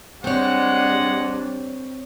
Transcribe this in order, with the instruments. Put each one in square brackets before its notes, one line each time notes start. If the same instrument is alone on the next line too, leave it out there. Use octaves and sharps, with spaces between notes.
[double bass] G3 D4 [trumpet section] G#3 F#5 [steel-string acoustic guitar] C4 C#5